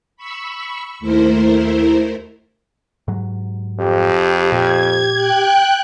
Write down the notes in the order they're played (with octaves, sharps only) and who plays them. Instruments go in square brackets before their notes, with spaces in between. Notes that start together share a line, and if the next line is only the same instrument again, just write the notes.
[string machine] B5 C#6 E6
D#2 A3 E4 A#4 C5
[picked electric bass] G#2 F#3
[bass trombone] F2 [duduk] G4
[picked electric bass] A#2 [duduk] G4 [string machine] G#6
[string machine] G5 F#6